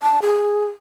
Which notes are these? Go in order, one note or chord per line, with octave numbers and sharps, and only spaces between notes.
A5
G#4